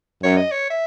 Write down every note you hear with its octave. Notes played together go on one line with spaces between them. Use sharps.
F#2 C#5
D#5
C#5
E5